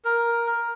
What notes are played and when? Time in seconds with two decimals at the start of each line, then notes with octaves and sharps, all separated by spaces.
0.05 A#4